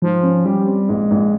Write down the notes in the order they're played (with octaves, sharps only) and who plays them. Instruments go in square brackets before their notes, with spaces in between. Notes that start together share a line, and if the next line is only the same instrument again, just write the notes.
[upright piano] G#2 [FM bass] F3
[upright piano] C#4
[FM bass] G3 [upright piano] G4
[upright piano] C4
[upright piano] A#1 [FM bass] G#3
[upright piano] A#1